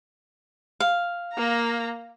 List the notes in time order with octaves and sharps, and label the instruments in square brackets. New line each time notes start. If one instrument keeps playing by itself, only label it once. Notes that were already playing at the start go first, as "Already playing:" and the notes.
[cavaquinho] F5
[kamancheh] A#3 A#5